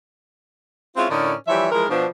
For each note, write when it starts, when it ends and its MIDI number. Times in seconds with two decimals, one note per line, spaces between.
0.96 1.08 56
0.96 1.08 60
0.96 1.08 61
0.96 1.08 64
0.96 1.08 65
1.10 1.34 45
1.10 1.34 50
1.10 1.34 61
1.10 1.34 63
1.10 1.34 70
1.10 1.34 74
1.48 1.67 52
1.48 1.67 53
1.48 1.67 55
1.48 1.67 73
1.48 1.67 76
1.71 1.84 52
1.71 1.84 53
1.71 1.84 56
1.71 1.84 70
1.89 2.07 47
1.89 2.07 53
1.89 2.07 62